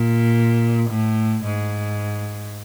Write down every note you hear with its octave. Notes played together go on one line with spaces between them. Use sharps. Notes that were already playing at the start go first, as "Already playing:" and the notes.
Already playing: A#2
A2
G#2